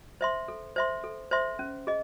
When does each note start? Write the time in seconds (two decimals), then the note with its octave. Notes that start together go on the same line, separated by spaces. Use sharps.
0.21 C5 E5 C6
0.48 A4
0.76 C5 E5 C6
1.04 A4
1.31 C5 E5 C6
1.59 C#4
1.87 G#4 D#5